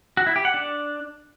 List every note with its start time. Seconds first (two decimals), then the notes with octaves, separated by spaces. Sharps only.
0.17 F#4
0.27 E4
0.36 G4
0.45 F#5
0.54 D4